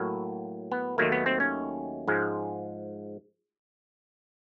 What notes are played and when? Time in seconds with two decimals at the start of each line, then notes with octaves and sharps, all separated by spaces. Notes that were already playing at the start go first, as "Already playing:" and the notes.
Already playing: A2 F#3 A#3
0.72 B3
0.98 D#2 D#3 F#3 A3 A#3
1.12 B3
1.26 C4
1.40 C#4
2.08 G#2 F3 G#3